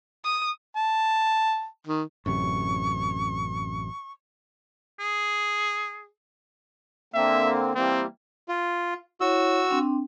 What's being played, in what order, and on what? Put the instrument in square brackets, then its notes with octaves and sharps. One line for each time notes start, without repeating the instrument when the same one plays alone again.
[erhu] D#6
[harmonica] A5
D#3
[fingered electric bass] A1 F#2 C3 [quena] C#6
[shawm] G#4
[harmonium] D3 A#3 C4 [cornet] E5
[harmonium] E3 G3 A#3 [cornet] C4
[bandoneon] F4
[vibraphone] E4 C#5 [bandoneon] F#4 E6
[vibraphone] C4 D4 G5